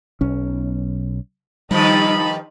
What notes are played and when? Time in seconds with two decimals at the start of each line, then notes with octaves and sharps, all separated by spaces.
0.21 B1 C#4
1.71 G2 D#3 F3 G3 D#4 B5